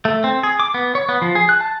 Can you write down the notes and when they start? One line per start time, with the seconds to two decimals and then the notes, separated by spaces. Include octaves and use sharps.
0.05 A3
0.24 C4
0.43 G#4
0.60 D6
0.74 B3
0.95 C#5
1.09 B3
1.22 F3
1.35 G#4
1.49 F#6
1.60 A5